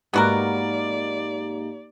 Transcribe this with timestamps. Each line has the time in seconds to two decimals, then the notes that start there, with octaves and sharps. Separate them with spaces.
0.14 G#2 A#3 B3 D#4 F#4 G4 A#4 D5